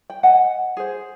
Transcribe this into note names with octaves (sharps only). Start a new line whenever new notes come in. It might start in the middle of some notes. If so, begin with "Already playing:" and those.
G5
D#5 F#5 G#5
G#4 C5